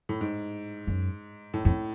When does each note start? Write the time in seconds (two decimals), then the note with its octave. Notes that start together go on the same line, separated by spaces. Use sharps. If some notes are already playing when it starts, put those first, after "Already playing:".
0.09 A2
0.21 G#2
0.87 F#2
1.54 A2
1.65 F2 A2